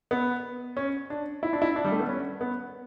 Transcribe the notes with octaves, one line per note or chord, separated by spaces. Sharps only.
B3
C#4
D4
E4
D4
E4
D4
G3
A3
B3
C#4
B3